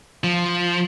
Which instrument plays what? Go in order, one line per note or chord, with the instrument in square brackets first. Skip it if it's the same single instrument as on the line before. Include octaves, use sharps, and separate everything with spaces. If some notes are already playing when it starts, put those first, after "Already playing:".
[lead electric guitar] F3